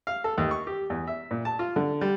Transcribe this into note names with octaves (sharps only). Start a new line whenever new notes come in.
F5
A4
D#2
C#6
G4
E2
E5
A#2
A5
F4
D3
G3